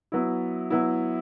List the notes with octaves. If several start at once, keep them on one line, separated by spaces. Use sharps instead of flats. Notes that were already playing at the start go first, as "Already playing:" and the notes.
F#3 B3 E4
F#3 B3 E4